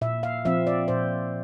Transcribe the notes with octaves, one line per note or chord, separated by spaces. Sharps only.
A#2 E5
F5
F3 C4 E5
D5
A#2 C5